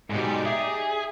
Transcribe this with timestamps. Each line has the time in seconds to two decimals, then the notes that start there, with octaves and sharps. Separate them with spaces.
0.10 G#2 B2 D#4 G4 D5 G#5
0.46 G#4 E5